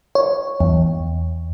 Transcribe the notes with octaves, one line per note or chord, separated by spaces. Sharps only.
C#5
E2